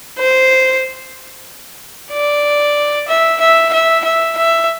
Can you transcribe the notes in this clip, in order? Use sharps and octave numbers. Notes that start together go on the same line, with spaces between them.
C5
D5
E5
E5
E5
E5
E5